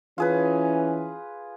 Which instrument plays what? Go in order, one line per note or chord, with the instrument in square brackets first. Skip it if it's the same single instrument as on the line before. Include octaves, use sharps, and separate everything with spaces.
[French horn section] E3 C#4 [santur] F4 G#4 B4